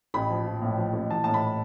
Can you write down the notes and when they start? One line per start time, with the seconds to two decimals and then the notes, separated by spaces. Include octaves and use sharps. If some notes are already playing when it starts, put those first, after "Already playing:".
0.14 A1 B5
0.30 F3
0.46 F3
0.62 A2
0.78 F3
0.93 A1
1.10 E3 A5
1.24 A2 A5
1.34 B5